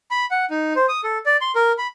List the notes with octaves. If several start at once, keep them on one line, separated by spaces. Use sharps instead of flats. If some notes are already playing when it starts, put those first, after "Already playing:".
B5
F#5
D#4
C5
D#6
A4
D5
C6
A#4
B5